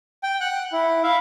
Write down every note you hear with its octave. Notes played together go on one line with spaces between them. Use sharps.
G5
F#5 F#6
E4
E4 E5 F5